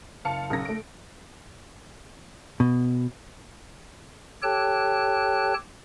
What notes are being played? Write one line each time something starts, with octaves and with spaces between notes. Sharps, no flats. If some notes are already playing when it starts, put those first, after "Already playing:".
F#1 F5 A5 C#7
B1 C#3 A#4 A#6
A3 D7
B2
G4 A4 C#5 G5 A5 F#6